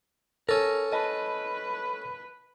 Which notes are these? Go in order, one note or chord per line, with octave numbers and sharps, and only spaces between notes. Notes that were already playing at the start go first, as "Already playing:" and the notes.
C#4 A4 A#4
B4 D#5 A5